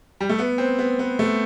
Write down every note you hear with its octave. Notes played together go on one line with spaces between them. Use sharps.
G3
A3
B3
C4
B3
B3
A3